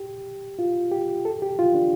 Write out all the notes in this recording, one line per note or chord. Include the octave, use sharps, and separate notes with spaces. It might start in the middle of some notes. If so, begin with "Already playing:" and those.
Already playing: G4
F4
G4
A4
G4
F4
D4